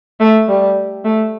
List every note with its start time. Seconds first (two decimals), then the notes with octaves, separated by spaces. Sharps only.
0.20 A3
0.48 G3
1.05 A3